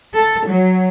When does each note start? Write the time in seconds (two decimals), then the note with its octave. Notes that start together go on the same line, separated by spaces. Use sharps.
0.15 A4
0.49 F#3